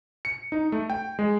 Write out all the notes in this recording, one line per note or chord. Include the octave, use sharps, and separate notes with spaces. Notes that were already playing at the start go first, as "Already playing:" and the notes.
C#7
D#4
A3
G5
G#3